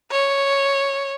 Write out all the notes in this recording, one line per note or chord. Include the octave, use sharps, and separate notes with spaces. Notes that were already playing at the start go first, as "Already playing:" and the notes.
C#5